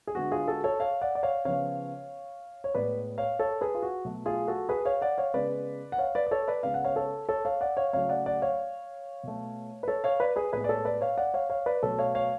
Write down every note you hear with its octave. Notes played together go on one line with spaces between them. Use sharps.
G#4
D3 G#3 B3 F#4
F4 G#4
F#4 A4
A4 C#5
C#5 F5
D5 F#5
D5
C#5 F5
C#3 F3 B3 C#5 F5
C#5
A2 G#3 B3 B4 D5
C#5 F5
A4 C#5
G#4 B4
F4
F#4
B2 F#3 A3
F4 G#4
F#4 A4
G#4 B4
C#5 F5
D5 F#5
C#5 F5
C#3 G#3 B3 B4 D5
F#5
C#5 F5
B4 D5
D5
A4 C#5
B4 D5
C#3 G#3 B3 F5
F#5
C#5 F5
A4 C#5
A4 C#5
C#5 F5
D5 F#5
C#5 F5
C#3 F#3 A3 C#5 F5
D5 F#5
D5 F#5
C#5 F5
B2 A3
B4
A4 C#5
C#5 F5
B4 D5
G#4 B4
A2 G#3 B3 G#4 B4
D5
A4 C#5
B4 D5
C#5 F5
D5 F#5
C#5 F5
C#5 F5
B4 D5
B2 F#3 A3 A4 C#5
C#5 F5
C#5 F5